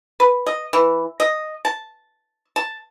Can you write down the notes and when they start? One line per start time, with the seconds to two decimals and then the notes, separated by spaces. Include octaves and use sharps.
0.20 B4
0.46 D#5
0.73 E3
1.20 D#5
1.65 A5
2.56 A5